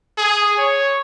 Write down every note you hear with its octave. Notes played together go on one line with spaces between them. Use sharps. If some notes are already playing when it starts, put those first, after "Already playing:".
G#4
C#5